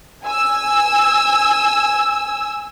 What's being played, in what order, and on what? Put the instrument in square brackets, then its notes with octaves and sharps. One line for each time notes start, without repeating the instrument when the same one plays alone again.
[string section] G#5 E6